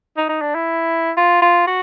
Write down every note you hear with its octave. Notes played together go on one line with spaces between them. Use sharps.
D#4
D#4
D4
E4
F4
F4
F#4